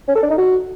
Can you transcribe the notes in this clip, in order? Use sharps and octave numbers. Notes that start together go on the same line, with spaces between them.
C#4
A4
D4
D#4
F#4